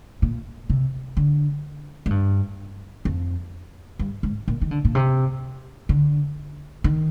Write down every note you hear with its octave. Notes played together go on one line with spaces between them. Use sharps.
A#2
C3
D3
G#2
G2
F2
G2
G#2
A#2
D#3
D3
A#2
C3
D3
D#3